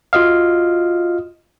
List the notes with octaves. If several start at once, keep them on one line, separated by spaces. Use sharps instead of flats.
F4 F#4 D#5 F5